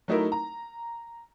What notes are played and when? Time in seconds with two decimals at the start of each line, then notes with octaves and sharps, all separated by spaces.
0.08 F#3 A3 D#4 E4 A#4
0.32 A#5